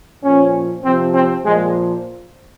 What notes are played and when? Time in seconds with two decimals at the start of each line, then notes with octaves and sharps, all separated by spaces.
0.23 A#2 F3 C#4
0.84 C3 F3 C4
1.15 C4
1.45 A#2 F3 G#3